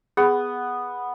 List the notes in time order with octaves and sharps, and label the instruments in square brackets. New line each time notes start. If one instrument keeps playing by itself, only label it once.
[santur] B3 [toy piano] G#4